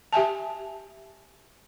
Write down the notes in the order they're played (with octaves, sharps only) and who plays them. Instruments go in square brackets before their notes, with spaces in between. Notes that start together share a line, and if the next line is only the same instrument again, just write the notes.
[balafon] G4 E5 G#5 A5